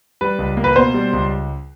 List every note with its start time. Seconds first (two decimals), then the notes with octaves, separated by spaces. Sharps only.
0.21 G3 B4
0.39 C#2
0.57 A#3
0.64 B4
0.76 B2 C5
0.94 G3
1.13 C#2